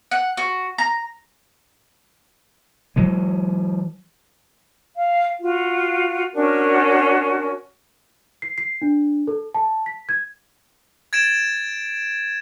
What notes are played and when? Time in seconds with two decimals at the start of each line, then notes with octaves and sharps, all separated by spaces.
0.11 F#5
0.37 F#4
0.78 A#5
2.96 E3 F#3 G#3
4.96 F5
5.41 F4 F#4
6.33 C#4 D4 F#4 A#4
8.42 C7
8.58 C7
8.82 D4
9.27 A4
9.55 A5
9.86 B6
10.09 G#6
11.13 G#6 A6 D7 E7